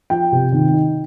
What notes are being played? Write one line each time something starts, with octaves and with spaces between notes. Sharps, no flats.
F3 G5
C3
D#3
D#4